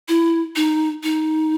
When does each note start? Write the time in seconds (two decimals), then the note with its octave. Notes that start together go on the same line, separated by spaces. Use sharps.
0.08 E4
0.56 D#4
1.03 D#4